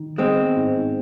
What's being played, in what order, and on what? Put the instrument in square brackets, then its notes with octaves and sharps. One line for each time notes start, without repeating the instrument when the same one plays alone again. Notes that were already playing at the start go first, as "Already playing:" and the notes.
Already playing: [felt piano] D#3
[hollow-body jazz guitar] G#3 C4 [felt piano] B3
[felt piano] G#2